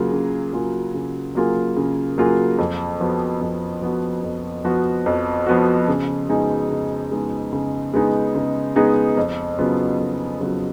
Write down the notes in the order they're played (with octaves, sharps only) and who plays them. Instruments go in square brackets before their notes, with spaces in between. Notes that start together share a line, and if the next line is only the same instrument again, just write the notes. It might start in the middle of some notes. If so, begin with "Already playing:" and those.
Already playing: [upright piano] C#3 F#3 A#3 F4 G#4
C#3
F#3 A#3 F4 G#4
C#3
F#3 A#3 F4 G#4
C#3
F#3 A#3 F4 G#4
F2
F3 B3 F#4
F2
F3 B3 F#4
F2
F3 B3 F#4
F2
F3 B3 F#4
C#3
G#3 B3 D#4 G#4
C#3
G#3 B3 D#4 G#4
C#3
G#3 B3 D#4 G#4
C#3
G#3 B3 D#4 G#4
F2
C#3 F#3 B3 F4
F2
C#3 F#3 B3 F4